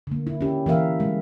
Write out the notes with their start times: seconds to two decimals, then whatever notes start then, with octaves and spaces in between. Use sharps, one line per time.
0.07 D3 A#3
0.27 E4
0.41 C#4 G4
0.66 E3 A#3 A#4 E5 F5
0.99 G3 G#3 A#3